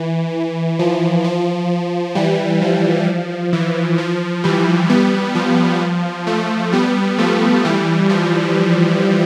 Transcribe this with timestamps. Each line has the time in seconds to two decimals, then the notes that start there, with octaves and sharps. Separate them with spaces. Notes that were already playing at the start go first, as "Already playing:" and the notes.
Already playing: E3
0.79 F3
1.24 F3
2.15 E3 G3
2.62 F3
3.53 E3
3.98 F3
4.44 E3 G3
4.90 G3 B3
5.35 F3
6.27 F3 A3
6.72 G3 B3
7.18 F3 A3
7.65 E3 G3
8.10 F3